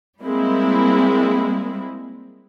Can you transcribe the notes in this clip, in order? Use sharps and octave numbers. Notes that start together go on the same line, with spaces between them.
G3 G#3 A#3 C4 E4